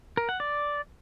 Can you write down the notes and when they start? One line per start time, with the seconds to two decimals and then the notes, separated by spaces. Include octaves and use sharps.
0.17 A#4
0.29 F#5
0.40 D5